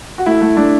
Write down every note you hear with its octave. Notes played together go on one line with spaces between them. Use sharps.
F#4
A3 E4
A3
A3 D4